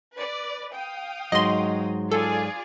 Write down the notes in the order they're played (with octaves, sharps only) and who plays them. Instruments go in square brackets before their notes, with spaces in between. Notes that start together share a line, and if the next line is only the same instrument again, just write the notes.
[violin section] B4 D5
F5 G5 D#6
[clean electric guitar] G#2 F#3 [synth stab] D#5 C6
[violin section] F4 G#4 D5 [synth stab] A4